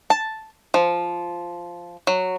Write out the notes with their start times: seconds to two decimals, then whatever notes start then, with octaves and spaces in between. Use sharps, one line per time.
0.10 A5
0.74 F3
2.07 F#3